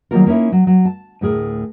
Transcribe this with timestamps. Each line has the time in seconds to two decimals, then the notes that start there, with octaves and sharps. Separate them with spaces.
0.11 D#3 F#3 G3 A#3 F4 A#4
0.27 A#3 C#4 D#4 E4
0.52 F#3
0.67 F#3
0.85 A5
1.21 D2 A2 G#4 A#4